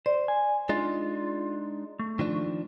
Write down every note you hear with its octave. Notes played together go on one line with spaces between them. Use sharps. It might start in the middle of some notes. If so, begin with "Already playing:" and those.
C5 D5
G#5
G#3 D4 D#4 F4
A3
D#3 F3 D4